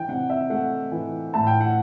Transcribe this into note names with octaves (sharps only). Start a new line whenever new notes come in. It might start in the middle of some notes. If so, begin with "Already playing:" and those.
Already playing: E3 G5
C3 F#5
E5
A3 F#5
E3
A2 A5
G5
F#5